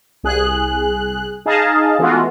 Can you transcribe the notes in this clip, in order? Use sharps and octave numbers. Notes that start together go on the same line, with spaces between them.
C2 G#4 F#6
D#4 G#4 D#5 F5 A5
E3 G#3 A3 B3 F4 F#4